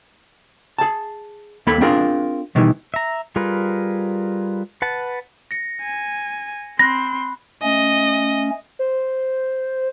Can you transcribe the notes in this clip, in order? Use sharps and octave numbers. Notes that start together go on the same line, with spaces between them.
G#4 A5
D#2 A#3 A4 B5
C4 D4 F4 G#4 A#4
B2 D#3 E3 G3
E5 A#5
G3 F4 G#4 A#4 B4
B4 F#5 A5
A#6 C#7
G#5
C4 B5 C6 F#6 A#6
A3 C#4 D#5
C5